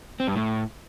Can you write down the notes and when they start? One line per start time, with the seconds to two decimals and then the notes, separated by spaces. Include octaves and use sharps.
0.20 C4
0.28 G2
0.36 A2